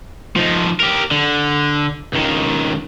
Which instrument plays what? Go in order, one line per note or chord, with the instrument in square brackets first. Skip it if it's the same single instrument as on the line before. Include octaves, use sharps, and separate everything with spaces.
[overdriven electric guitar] F3 D#4
G4 A#4
D3
C#2 D#3